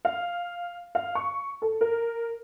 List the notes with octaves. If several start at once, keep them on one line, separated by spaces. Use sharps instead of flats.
F5
F5
C#6
A4
A#4